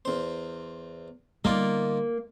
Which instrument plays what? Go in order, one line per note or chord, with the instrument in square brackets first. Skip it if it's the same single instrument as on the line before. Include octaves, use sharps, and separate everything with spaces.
[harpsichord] E2 C5
[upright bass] D3 G3 [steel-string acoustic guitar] A#3 [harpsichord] D#4 F4 D5